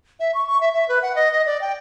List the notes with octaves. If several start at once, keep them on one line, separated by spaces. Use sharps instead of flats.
E5
C#6
C#6
E5
E5
B4
F#5
D#5
D#5
D5
G5